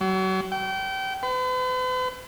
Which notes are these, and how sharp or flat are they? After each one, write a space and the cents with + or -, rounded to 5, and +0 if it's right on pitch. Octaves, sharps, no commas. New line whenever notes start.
F#3 +35
G5 -30
B4 +45